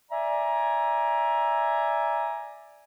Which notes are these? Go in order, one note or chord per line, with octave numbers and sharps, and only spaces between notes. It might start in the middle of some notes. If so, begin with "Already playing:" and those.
D5 E5 G#5 A#5